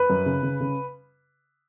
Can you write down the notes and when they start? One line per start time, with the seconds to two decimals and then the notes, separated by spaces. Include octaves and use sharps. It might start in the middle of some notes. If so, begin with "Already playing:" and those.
Already playing: B4 B5
0.10 F#2
0.26 C#3
0.43 C#3
0.60 C#3